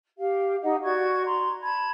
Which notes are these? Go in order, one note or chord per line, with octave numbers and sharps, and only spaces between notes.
G4 F5
D#4 G4 D#5 F#5
F#4 D5 C#6 G#6
A#5 C6
A5 B5 G#6